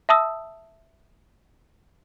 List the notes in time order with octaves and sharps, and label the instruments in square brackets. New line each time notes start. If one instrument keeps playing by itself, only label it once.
[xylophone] E5 A5 D#6 E6